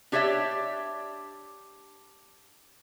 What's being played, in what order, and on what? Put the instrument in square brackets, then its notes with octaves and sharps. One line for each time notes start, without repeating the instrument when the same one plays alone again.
[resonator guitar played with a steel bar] D4 G4 C#5 D5 E5